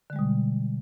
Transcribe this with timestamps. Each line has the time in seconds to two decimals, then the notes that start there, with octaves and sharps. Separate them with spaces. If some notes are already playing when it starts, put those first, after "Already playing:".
0.10 D3
0.13 G#3
0.16 G3
0.19 B2